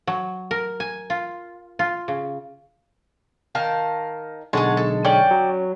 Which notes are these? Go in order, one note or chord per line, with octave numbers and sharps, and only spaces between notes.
F#3
A#4
G#5
F4
F4
C#3
D#3 F5 A5
B1 D3 G#3 G#4 C#5 F#5 A5
A4
C#4 D5 G5 C#6
F#3